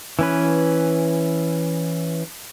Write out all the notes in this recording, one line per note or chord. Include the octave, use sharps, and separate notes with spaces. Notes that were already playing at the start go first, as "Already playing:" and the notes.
E3 C#4 B4